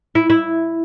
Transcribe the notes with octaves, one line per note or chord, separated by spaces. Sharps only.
E4
E4